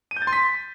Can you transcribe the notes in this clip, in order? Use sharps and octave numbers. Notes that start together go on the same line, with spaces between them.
D#7
G6
A6
C6
B6